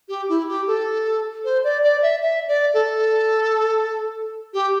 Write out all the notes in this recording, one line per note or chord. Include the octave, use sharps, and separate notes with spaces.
G4
E4
G4
A4
C5
D5
D5
E5
E5
D5
A4
G4